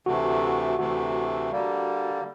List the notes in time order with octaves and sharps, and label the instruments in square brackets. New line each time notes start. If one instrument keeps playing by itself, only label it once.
[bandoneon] D2 C3 E3 A3 [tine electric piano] F#4
[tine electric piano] F#4
[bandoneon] D2 C3 E3 A3 [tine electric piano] F#4
[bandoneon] D3 G3 A#3